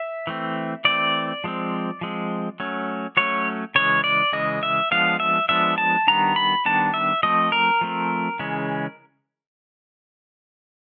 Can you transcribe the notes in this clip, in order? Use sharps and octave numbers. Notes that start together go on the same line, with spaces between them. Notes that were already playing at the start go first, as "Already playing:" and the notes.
Already playing: E5
E3 A3 C4
E3 A3 C4 D5
F3 G#3 C4
F3 G#3 C4
F#3 A3 C#4
F#3 A3 C#4 C#5
C#3 E3 G#3 C#5
D5
C#3 E3 G#3 D#5
E5
F3 G#3 B3 D4 F5
E5
F3 G#3 B3 D4 E5
A5
D#3 G3 B3 D4 A#5
B5
D#3 G3 B3 D4 A5
E5
F3 A3 C4 D#5
A#4
F3 A3 C4
C#3 E3 G#3 C#4